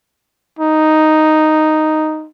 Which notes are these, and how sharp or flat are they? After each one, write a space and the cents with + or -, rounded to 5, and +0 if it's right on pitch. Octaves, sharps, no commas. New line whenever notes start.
D#4 +0